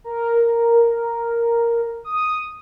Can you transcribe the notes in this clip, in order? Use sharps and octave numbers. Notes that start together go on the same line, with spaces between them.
A#4
D#6